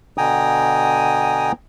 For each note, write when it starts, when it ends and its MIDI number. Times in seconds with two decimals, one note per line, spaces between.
0.18 1.52 47
0.18 1.52 50
0.18 1.52 79
0.18 1.52 80
0.18 1.52 82
0.18 1.52 87